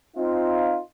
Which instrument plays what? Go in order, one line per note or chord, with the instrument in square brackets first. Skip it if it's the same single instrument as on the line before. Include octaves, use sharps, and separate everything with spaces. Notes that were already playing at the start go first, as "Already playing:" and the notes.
[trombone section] C4 D#4 F4